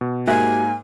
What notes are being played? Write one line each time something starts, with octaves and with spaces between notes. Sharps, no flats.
B2
G#2 A#3 F#4 G4 E5 G#5